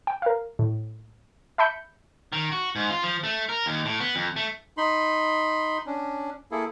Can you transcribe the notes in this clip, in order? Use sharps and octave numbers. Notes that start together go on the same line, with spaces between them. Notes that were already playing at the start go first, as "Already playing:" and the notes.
G5
A#4 F5
A2
E5 A5 B5 G6 C#7
D#3
F#4
G#2
F4
F3
A3
A#4
D#2
A2
B3
F2
A3
D#4 B5 C6
C#4 D4
A#3 E4 G#4 A4